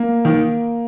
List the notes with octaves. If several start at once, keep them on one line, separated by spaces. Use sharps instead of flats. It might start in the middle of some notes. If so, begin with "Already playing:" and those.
Already playing: A#3
D#3